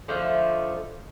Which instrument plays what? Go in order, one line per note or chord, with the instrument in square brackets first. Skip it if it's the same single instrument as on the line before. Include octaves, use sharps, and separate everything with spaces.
[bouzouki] D3 F3 A3 D#4